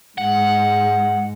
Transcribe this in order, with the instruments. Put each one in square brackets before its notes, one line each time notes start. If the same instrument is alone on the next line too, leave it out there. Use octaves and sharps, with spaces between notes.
[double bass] G#2 G#3 [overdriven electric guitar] F#5